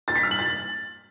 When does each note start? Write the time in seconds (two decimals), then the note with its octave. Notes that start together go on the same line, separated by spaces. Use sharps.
0.08 A6
0.16 B6
0.23 F6
0.31 F#7
0.39 A6